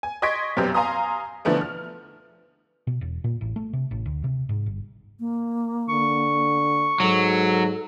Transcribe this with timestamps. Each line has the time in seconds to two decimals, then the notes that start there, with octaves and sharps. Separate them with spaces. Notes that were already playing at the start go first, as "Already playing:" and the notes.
0.03 G#5
0.22 D#5 C6 C#6 G#6 B6 D7
0.57 F1 F#2 B2 C4 G4
0.74 F5 G#5 A#5 C6 D#6
1.45 B2 D3 E3 F3 A3 B3
1.61 F6
2.87 B2
3.01 E1
3.24 A#2
3.41 A1
3.56 A3
3.73 C3
3.91 A1
4.06 D2
4.24 C3
4.49 G#2
4.66 G1
5.20 A#3
5.89 D3 C#6
7.00 G#2 F#3 A4